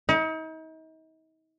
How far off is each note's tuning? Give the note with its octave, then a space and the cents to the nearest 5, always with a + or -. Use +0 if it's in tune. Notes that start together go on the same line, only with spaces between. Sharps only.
D#4 +40